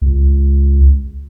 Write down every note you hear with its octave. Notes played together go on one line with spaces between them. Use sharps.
C#2